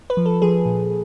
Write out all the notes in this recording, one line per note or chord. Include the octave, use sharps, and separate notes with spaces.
B4
F3
A4
F3 G#4
A#2